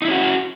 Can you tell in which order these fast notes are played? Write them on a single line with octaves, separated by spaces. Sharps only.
D#4 E4 C#4 F#4